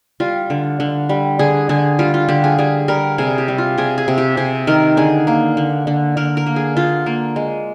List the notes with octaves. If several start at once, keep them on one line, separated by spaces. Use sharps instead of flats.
G3 F4
D3
D3
G3
D3 G#4
D3 G#4
G3 F4
F4
D3 G4
G#4
G3 G#4
G3 A#4
C3 G#4
G4
G3
F4
C3 G#4
G#4
C3
G4
C3 G#4
D#3 A#4
D3 G#4
A#3
D3
D3
D3 A#4
A#4
A#3
G#4
D3 F4
A#3
G#3